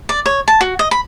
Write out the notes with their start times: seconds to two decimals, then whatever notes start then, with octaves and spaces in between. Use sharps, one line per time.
0.09 D5
0.26 C#5
0.48 A5
0.61 F#4
0.79 D#5
0.91 B5